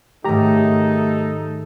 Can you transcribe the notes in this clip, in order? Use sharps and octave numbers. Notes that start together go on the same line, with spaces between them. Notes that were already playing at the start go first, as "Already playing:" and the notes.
G#2 D#3 F#3 A3 D#4 G4 A4 A#5